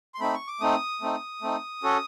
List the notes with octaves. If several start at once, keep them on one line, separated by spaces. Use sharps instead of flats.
C6
A3 C4 D#4 B5
C#6
D6
A3 C4 D#4 D#6
A3 C4 D#4
A3 C4 D#4
C#4 F#4 A4